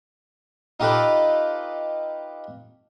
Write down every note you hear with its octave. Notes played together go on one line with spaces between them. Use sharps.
D#4 F4 G4 A4 B4